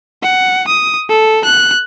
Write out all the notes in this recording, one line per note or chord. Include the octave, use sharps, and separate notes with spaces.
F#5
D#6
A4
F#6